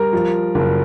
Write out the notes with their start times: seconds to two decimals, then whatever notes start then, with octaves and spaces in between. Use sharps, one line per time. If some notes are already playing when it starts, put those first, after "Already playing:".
Already playing: G3 A#4
0.13 F3
0.55 F#1